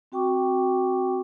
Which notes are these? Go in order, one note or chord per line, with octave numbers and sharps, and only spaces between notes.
C4 F#4 G5 C#6 D6